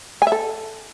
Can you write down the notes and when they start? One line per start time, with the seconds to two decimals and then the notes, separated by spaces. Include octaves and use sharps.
0.22 G#5
0.27 E5
0.32 A4